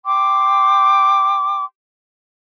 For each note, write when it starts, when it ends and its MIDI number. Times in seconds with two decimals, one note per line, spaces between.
0.06 1.65 79
0.06 1.65 84
0.06 1.65 86